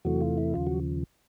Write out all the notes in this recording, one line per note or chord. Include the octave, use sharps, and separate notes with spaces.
E2 C3 E3 F#3 A3 F#4
F4
E4
D#2 C#3 F3 F4
F#3 F#4